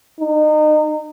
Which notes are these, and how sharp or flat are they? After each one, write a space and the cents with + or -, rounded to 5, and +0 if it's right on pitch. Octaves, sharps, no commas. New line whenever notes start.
D#4 -30